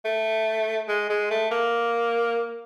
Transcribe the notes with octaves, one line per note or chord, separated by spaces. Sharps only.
A3
G#3
G#3
A3
A#3